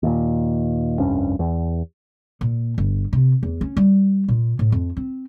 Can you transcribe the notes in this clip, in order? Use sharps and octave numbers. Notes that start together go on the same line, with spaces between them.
D#2 A#2
F1 C2 G2 C#4
E2
A#2
G1
C3
E2
C#4
G3
A#2
A2
F2
C4